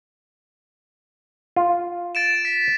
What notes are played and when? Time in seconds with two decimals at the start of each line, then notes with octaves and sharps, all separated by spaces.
1.56 F4
2.15 A6 D7 E7
2.45 B6